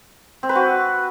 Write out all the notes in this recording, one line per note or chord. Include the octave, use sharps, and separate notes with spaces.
C4
B4
F#4